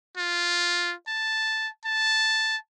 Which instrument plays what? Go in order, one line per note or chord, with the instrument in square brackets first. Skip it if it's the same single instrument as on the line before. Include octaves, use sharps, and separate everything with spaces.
[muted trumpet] F4
A5
A5